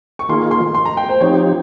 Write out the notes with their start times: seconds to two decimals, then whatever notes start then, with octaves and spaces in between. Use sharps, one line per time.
0.19 C#6
0.29 D#3 A#3 F4 G#4 C6
0.51 C6
0.75 C6
0.85 A#5
0.97 G5
1.09 C5
1.20 F3 C4 D#4 G4 C#5